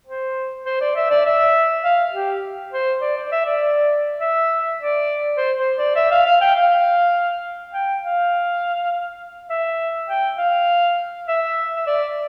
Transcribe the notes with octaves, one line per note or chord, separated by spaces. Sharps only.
C5
C5
D5
E5
D5
E5
F5
G4
C5
D5
D5
E5
D5
E5
D5
C5
C5
D5
E5
F5
F5
G5
F5
G5
F5
E5
G5
F5
E5
E5
D5